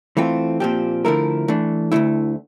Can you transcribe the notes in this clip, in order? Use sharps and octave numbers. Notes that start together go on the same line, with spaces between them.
E3 A3 C4 F4
A#2 F3 C4 G4
D3 F3 A3 E4 A#4
E3 A3 D4
D2 D3 A3 E4